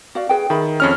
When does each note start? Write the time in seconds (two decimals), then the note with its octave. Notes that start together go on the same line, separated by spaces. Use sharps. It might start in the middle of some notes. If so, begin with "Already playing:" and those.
0.15 F#4 D5 F5
0.29 G#4 B4 G5
0.50 D#3 G#4 E5 B5
0.80 F2 C#4 F6